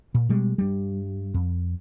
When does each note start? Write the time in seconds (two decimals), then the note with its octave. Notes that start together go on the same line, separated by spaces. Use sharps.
0.15 A#2
0.29 B2 G3 G#3
0.58 G2 G3
1.34 F2